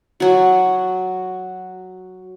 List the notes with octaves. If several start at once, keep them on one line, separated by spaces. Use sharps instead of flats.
F#3 F#4